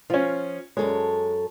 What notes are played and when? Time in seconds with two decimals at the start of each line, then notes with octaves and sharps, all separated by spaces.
0.10 F3 C#4 F4
0.77 F#2 G#3 A4 C#5